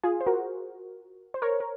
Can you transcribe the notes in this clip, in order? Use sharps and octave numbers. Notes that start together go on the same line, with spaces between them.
F4 G#4
C5
F#4 A#4
C5
A#4 C#5
A#4